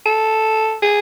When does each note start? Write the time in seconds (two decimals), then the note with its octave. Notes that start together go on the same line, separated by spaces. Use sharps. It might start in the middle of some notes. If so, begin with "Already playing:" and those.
0.06 A4
0.83 G#4